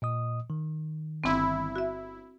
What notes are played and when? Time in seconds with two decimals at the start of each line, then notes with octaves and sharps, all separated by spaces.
0.02 A#2 D#5 D#6
0.50 D#3
1.24 G1 C4 E4
1.76 F#4 E5